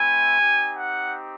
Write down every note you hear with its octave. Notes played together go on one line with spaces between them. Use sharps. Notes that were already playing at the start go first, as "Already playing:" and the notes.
Already playing: A3 C4 E4 G#5
C4 D#4 G4
F#5